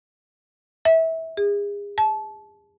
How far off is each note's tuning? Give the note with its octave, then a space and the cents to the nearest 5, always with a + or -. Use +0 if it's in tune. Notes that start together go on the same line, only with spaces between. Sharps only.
E5 -25
G#4 -35
A5 -25